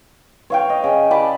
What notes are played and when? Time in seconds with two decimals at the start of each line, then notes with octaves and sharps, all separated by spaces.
0.50 C#5 F5 G5
0.70 D#5
0.84 C#3
1.10 D5 G5 A5 B5